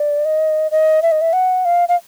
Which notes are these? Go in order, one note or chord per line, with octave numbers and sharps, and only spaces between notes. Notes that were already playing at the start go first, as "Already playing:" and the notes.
Already playing: D5
D#5
D#5
E5
D#5
E5
F#5
F5
F5